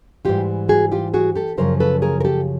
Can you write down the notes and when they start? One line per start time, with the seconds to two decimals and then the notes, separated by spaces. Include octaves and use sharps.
0.25 G#2 E3 G3 F4 G4
0.69 F#4 G#4
0.92 F4 G4
1.14 F#4 G#4
1.35 G4 A4
1.58 F#2 C#3 F3 A#4 C5
1.80 A4 B4
2.02 G#4 A#4
2.21 A#4
2.25 G4 A4